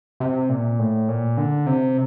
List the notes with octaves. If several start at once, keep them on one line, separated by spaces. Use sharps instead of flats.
C3
A#2
A2
A#2
D3
C3